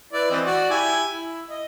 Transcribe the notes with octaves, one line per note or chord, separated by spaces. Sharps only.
E4 B4 D5
E3 C4 D#5
F#4 D5
E4 G4 G#5
E4
D#5